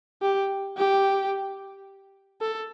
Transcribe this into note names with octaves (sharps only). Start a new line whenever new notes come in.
G4
G4
A4